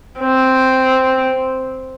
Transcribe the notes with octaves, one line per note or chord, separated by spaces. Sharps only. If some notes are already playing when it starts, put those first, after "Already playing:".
C4